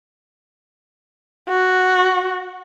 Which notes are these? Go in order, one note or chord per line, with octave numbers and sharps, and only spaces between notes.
F#4